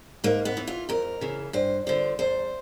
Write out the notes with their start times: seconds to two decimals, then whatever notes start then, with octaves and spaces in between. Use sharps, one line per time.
0.24 G#2 A#3
0.45 B3
0.57 E3
0.67 F4
0.89 F2 A#4
1.21 C#3 E3
1.53 G2 C5
1.87 D3 F3 C5
2.19 E2 C5